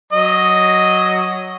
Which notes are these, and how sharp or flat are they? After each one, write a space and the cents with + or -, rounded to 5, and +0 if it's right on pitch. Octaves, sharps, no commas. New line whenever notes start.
F#3 +0 D#5 +0